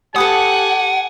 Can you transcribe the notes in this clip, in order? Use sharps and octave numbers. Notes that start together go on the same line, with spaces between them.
G4 A4 B4 F#5 G#5 D#6